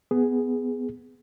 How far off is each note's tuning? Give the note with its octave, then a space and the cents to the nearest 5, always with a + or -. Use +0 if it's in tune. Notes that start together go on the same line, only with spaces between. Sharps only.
B3 +10 G#4 +0